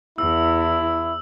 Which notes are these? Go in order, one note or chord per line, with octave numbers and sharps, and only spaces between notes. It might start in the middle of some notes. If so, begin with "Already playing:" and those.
E2 E4 E6